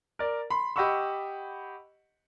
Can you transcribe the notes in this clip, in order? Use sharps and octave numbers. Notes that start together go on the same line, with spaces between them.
A#4 D5
B5 C6
G4 D#5 F#5 B5 C#6 E6